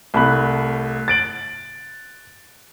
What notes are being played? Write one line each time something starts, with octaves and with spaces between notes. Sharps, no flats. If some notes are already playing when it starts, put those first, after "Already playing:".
C2 A3 B5 F#6
A6 D7 F#7